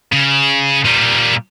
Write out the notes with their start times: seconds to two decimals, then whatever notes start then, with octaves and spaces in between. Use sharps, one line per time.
0.13 C#3
0.85 A#2 G3